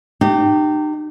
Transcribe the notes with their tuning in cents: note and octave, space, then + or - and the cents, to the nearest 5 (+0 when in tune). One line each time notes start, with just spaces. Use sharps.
D#4 -40 G4 -15